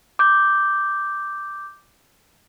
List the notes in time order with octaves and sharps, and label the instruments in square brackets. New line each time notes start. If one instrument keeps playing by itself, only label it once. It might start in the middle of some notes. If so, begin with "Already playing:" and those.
[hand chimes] D6 G6